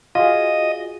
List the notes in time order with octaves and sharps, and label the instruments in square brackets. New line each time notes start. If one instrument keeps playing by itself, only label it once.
[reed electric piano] F4 F#4 G#4 [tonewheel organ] D#5 [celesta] F5